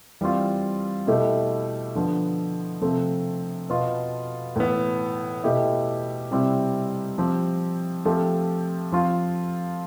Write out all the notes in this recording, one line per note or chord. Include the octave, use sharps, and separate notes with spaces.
E3 G3 C4 F4
B2 A3 E4 G4
D3 F3 B3
C3 F3 A3 C4
B2 B3 F4
A2 E3 B3
B2 A3 E4 G4
C3 G3 C4 E4 G4
F3 C4 G4
F3 A3 C4 G4
F3 C4 F4